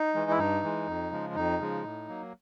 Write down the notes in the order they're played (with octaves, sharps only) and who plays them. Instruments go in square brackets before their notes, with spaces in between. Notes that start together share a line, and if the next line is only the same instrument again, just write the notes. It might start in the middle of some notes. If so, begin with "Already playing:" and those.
Already playing: [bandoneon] D#4
E3 G#3
E4
G2 D#4
E3 G#3
F2
C#3 F3 G#3
F2 D#4
C#3 F3 G#3
A2
F#3 A#3